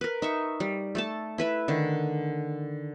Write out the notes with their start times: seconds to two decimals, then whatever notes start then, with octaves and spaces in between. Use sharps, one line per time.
0.01 A#4 B4
0.22 D#4 E5 C#6
0.60 G3
0.95 A3 A4 A5
1.38 E4 B4 E5
1.68 D3 D#3